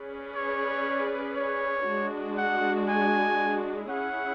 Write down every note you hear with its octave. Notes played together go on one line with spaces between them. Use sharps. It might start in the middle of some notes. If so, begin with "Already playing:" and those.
Already playing: C#4 G#4 B4 D5
C#5
C#5
G#3 D4 F#4
F#5
G#5
C#4 E4 G#4 F#5